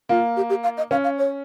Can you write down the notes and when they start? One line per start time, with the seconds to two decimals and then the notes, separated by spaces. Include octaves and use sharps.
0.09 A#3 F4
0.37 G4
0.50 G4
0.63 F5
0.77 D#5
0.91 C#4 F5
1.04 F5
1.18 C#5